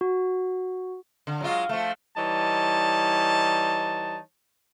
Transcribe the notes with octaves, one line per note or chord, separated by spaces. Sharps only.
F#4
D3
F#3 G#3 F4
F3 A3
E3 G3 D#4 C#5 A5